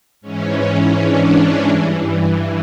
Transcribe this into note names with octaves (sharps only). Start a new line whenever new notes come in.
G#2 E3 C#4
D4
G2 E3